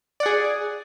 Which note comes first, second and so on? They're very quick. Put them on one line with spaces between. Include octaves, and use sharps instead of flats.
D5 F#5 G#4